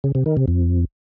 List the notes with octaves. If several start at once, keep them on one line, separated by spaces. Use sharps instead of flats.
C#3
C3
D#3
C3
F2